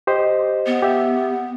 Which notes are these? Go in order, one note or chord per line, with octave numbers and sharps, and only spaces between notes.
G4 C5 D#5
B3
G4 E5